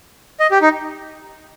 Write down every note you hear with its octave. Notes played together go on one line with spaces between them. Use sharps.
D#5
G4
D#4